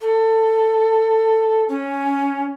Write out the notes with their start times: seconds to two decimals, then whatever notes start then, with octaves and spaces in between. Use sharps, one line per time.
0.01 A4
1.69 C#4